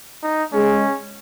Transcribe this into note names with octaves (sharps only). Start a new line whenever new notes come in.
D#4
G#3 C#4